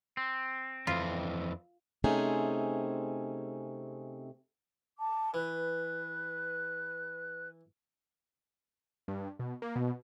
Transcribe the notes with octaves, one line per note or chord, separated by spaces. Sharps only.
C4
F2 E3 F4
C3 A3 C4 C#4 D#4 G#4
A5 D6
E3 B4 F#6
G2
B2
A#3
B2